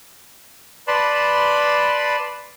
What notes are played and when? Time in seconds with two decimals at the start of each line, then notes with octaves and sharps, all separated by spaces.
0.88 B4 D5 A5 B5 C6